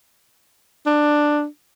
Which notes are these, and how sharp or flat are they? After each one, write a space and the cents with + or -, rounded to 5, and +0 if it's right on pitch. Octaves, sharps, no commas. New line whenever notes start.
D4 +10